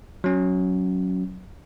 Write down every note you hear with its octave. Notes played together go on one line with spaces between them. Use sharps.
F#3 C#4